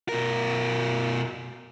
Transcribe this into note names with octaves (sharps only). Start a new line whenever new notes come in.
B2 A#4